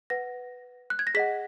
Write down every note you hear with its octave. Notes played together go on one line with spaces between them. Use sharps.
B4 F#5 A#6
F#6
G#6
A#6
G#4 D#5 F#5 B6